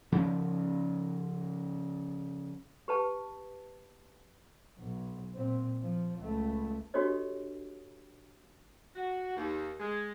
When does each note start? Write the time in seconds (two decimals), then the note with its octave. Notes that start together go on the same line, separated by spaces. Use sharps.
0.12 C#3 F3 C#4
2.88 G4 B4 A5
4.79 B1
5.33 A#2 C4
5.82 F3
6.19 C#2 A3
6.94 D4 F#4 G4 A4 C#5 D#5
8.95 F#4
9.36 D#2
9.80 G#3